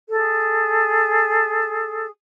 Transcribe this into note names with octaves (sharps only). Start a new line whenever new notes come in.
G#4 A4